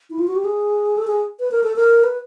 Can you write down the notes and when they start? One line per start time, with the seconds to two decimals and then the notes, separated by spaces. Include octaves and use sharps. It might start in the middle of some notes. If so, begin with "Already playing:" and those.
0.10 E4
0.19 F4
0.27 F#4
0.35 G4
0.44 G#4
0.97 A4
1.07 G#4
1.39 B4
1.51 A#4
1.63 A4
1.76 A#4
2.04 B4